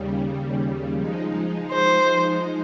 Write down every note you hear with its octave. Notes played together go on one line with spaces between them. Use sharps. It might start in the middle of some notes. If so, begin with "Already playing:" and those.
Already playing: D#2 C#3 G3
F3 G#3 D#4
C5